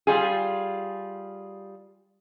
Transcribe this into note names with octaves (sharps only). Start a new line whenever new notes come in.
G3 F4 G#4